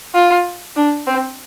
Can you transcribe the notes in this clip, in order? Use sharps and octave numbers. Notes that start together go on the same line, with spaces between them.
F4
D4
C4